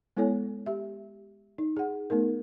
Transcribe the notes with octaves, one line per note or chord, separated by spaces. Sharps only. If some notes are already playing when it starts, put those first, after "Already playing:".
G#3 B3 E4 A4 C#5 G#5
G4 E5
D#4
G#4 F#5
A3 B3 D#4 A#4